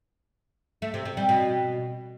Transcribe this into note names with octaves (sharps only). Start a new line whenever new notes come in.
A3
C3
C3
G3
B2